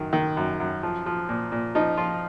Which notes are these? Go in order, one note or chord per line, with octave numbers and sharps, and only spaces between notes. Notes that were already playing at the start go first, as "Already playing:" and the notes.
Already playing: F#2 D#3
D#3
F#2
F#2
F3
F3
A#2
A#2
F3 D#4
F3 F4